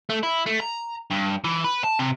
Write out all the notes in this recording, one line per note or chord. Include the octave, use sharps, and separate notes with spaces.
A3
E4
A3
A#5
G2
E3
B4
A5
C3